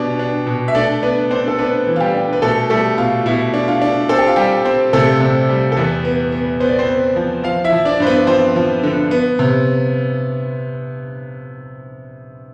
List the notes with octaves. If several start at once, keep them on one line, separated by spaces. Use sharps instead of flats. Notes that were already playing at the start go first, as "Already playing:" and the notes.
Already playing: B2 B3 D4 G4
D4
B2
E5
A3 D4 D5
B3 D4 B4
C4 D4 C5
A4
B3 D4 B4
E3
F4
G3 G4
D4
B4
B2 A3 A4
G3 A3 A4
B2 F4
B2 E4
D4
F4
D4
C4 A4
G4
F4
G3 G4
C4
C3 A3 A4
C3
G3
A4
E2 B3 B4
B3
B3
B3 C5
D5
C4 C5
B3
F3
F3 F4 F5
E4 E5
F3
D4 D5
G2 C5
B3 B4
F3 C4 C5
F3
D3
B3
C3